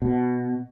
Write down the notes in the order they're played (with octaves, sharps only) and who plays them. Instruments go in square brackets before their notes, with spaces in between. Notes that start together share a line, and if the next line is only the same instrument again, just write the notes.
[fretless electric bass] B2